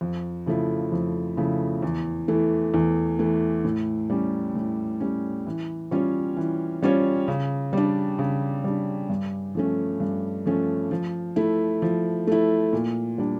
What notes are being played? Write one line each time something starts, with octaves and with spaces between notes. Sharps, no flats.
F2
C#3 F3 A3 E4
F2
C#3 F3 A3 E4
E2
E3 A3
E2
E3 A3
A2
G3 C#4
A2
G3 C#4
E3
G3 C#4 F4 C#5
E3
G3 C#4 F4 C#5
C#3
G3 D4
C#3
G3 D4
G2
F3 A3 C#4
G2
F3 A3 C#4
F3
A3 E4
F3
A3 E4
A#2
G3 D4